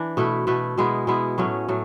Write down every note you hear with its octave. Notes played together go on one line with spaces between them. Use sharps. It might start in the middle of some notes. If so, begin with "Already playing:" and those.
Already playing: E3 D4
B2 A3 E4 B4
B2 A3 E4 B4
B2 G#3 B3 E4
B2 G#3 B3 E4
A2 F#3 A3 C#4
A2 F#3 A3